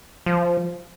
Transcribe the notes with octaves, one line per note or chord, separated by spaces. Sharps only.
F3